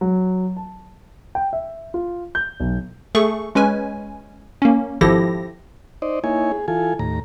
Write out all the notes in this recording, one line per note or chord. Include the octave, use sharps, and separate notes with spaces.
F#3
A5
G5
E5
F4
G6
B1
A3 G#4 A4 C#6
G#3 C#4 B4 G#5
A#3 C#4
G#1 F3 E4 G4 A4 A#6
D#4 C5 D5 D#5
A#3 D#4 E4 C#5 G#5
G#4
E3 F4 A4 G#5
D#2 A2 A#5